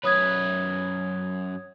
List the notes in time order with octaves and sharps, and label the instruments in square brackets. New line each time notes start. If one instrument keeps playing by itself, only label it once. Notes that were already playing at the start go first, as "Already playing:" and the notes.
[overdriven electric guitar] F#2 B4 [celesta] C#5 D#6 G#6